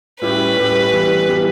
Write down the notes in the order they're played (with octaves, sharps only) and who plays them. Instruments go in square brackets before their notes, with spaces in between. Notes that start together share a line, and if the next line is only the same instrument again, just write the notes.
[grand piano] A2 G3 C#4 E4 G4 [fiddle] B4
[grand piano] A2 G3 C#4 E4 G4
E3 G3 B3 E4 G4
E3 G3 B3 E4 G4